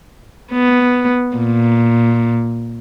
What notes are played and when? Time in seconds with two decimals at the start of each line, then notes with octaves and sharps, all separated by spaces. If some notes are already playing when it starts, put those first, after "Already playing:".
0.52 B3
1.37 A#2